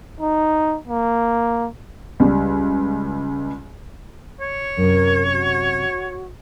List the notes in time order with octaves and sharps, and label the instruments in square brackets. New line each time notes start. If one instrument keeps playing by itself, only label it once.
[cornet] D#4
A#3
[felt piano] C#2 G3
[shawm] C#5
[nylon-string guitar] F#2 A2 C3 [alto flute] A#4
[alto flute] F#4